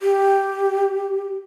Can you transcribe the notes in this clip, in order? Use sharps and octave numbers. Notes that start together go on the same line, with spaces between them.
G4